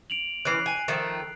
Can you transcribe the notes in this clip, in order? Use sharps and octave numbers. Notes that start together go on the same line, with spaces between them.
D7 F7 F#7
E3 C#4 F#6 C7
G#5
D#3 F3 A3